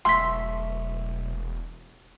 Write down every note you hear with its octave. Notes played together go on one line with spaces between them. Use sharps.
E1 B1 A3 E5 C6 B6